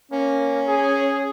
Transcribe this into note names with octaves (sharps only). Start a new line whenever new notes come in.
A#3 C#4
G#4